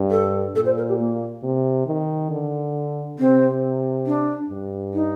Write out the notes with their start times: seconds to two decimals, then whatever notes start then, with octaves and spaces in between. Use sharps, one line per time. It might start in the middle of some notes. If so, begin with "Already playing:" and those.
Already playing: G2
0.11 A4
0.55 A#2 A4
0.65 C5
0.77 A#4
0.88 G4
0.99 A#3
1.43 C3
1.86 D#3
2.30 D3
3.18 C3 C4
4.06 D4
4.49 G2
4.94 D#4